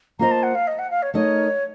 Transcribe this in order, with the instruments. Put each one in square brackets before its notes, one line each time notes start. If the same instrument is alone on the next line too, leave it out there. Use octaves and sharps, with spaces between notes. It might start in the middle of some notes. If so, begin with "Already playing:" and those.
[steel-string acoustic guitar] A#3 F4 C5 D#5 [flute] A#5
[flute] A5
F#5
F5
D#5
F#5
F5
C#5
[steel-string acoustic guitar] A3 D#4 A#4 D#5 [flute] C#5